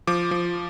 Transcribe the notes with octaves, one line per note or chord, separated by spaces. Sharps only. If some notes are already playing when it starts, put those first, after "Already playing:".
F3 D6
F3